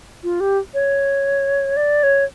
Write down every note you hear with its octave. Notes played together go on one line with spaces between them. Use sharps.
F4
G4
C#5
D5
C#5